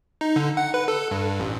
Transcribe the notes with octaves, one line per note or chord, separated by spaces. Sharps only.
D#4
D3
F#5
B4
A4
G2
A1